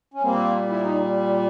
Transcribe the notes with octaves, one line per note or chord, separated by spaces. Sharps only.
C#4
A#2 G3 A#3 C4
E4
D#4